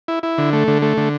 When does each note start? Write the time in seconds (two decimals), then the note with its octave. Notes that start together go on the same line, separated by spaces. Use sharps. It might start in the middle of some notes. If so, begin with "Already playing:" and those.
0.08 E4
0.23 E4
0.38 D3
0.53 A3
0.68 D3
0.82 A3
0.97 D3